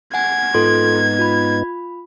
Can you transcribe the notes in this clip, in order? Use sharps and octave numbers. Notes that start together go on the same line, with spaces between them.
F#5 G#5 G#6
G#2 B3 D#4 F4 A4 C6
F4 B5